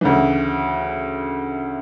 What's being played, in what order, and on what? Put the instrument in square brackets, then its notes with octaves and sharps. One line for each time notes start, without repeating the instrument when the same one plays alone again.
[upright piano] D2 C#3 E3